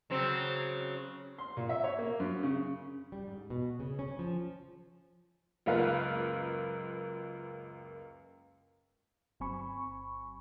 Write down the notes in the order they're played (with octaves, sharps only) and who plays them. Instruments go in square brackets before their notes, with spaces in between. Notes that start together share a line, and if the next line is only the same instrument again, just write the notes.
[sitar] C#3 F#3 C4
[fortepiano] C6
A#2
E5
C#5
A#3
F#2
C#3
[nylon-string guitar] G3
G#2
B2
C#3
C#4
F3
[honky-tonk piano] C#2 F#2 A#3 F4 B4 F5
[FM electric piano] G1 F#3 C4 G#5 B5 C#6